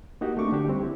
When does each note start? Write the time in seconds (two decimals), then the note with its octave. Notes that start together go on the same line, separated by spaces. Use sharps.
0.21 A#3 D#4 F#4 G4
0.37 A3 C4 D4 C#6 D6
0.52 D3 D4 G4
0.68 G3 C4
0.81 E4